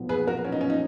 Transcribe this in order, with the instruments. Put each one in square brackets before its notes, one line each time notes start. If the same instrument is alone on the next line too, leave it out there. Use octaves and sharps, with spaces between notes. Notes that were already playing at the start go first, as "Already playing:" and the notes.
Already playing: [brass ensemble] B1 A#2 F3 B3
[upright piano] G#4 B4
F#4 A#4
C#4
D#4
C#4
D#4